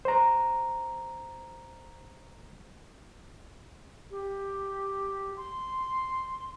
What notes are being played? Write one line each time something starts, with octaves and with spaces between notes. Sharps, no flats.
C5 A#5
G4
C6